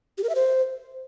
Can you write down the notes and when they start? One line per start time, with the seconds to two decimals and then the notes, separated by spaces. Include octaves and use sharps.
0.18 G4
0.24 A#4
0.29 E5
0.35 C5